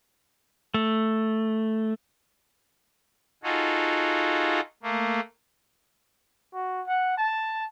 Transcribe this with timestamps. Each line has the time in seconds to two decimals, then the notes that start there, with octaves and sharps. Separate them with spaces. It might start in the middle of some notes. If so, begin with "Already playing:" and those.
0.74 A3
3.43 D#4 F4 F#4 G#4 A4
4.83 A3 A#3
6.54 F#4
6.87 F#5
7.17 A5